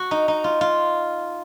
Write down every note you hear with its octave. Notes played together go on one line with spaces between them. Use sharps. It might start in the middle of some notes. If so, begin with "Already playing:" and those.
Already playing: F#4
D#4
D#4
F4
F4